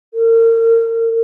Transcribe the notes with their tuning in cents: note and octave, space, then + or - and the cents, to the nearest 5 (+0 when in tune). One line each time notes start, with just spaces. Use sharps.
A#4 -30